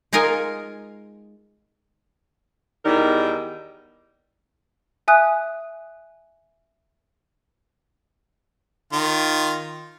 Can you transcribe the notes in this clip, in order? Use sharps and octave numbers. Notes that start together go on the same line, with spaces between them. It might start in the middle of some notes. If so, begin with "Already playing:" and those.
G#3 D#4 F4 A#4 G#5
E2 D#3 G3 D#4 A#4
E5 G#5 D#6 F#6
D#3 F4 C6